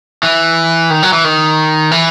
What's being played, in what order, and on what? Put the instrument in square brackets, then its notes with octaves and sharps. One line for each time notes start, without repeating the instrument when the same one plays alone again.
[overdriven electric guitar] E3
D#3
F#3
E3
D#3
E3